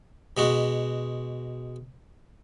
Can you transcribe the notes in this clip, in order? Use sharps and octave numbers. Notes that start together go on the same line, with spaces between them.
B2 G#3 F#4